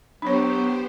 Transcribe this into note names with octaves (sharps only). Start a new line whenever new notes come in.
F#3 B3 D4 G4 C5 C#5